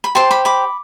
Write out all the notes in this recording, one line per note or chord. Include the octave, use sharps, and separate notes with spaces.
B5
G4 C5 A5 C6
B5 D6
B5 D6